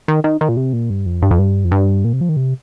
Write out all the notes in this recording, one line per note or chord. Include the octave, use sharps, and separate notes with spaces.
D#3
D#3
D#3
A#2
C3
A#2
G2
F2
G2
F2
G2
F2
G2
A#2
C3
F3
D#3
C3